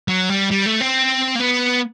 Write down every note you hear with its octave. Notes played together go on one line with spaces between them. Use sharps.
F#3
G3
G3
A3
C4
A#3
B3